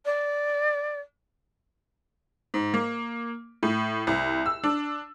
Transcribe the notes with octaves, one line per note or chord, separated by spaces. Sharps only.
D5
G#2
A#3
A2
C2
E6
D4